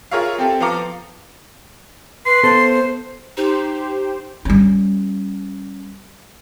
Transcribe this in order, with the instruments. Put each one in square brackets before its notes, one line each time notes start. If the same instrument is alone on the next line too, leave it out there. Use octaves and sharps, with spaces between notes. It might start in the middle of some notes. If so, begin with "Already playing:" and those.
[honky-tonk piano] F4 G#4 A#4 C#5 E5 F5
C4 G4 A4 E5
F3 B3 F5 A#5 D6 C#7
[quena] B4 [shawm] C6
[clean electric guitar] B3 A4 [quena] C5
[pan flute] D#4 [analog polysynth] G4 C5
[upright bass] G3 C#4